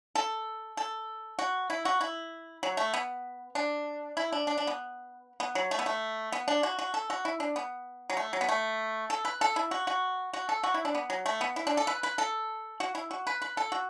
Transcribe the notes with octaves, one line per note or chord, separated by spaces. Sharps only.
A4
A4
F#4
E4
F#4
E4
F#3
A3
B3
D4
E4
D4
D4
D4
B3
B3
F#3
A3
B3
A3
B3
D4
F#4
F#4
A4
F#4
E4
D4
B3
F#3
A3
F#3
B3
A3
A4
B4
A4
E4
F#4
F#4
F#4
A4
F#4
E4
D4
B3
F#3
A3
B3
E4
D4
A4
B4
B4
A4
F#4
E4
F#4
B4
B4
A4
F#4